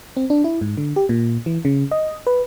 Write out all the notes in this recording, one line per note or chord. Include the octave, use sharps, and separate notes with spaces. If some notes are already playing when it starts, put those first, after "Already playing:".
C4
D4
E4
G#2
D3
G4
A#2
E3
C#3
D#5
B4